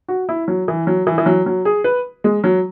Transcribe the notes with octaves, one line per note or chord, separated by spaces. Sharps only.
F#4
E4
F#3
E3
F#3
E3
E3
F#3
F#3
G#4
B4
G#3
F#3